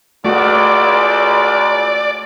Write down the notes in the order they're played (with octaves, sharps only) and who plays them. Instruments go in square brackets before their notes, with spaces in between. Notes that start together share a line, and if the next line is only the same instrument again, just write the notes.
[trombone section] C#2 [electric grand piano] A3 F#4 [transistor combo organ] D5